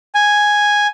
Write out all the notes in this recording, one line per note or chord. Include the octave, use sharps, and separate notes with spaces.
G#5